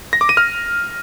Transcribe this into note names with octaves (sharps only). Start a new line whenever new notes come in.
A#6
D6
D#7
F6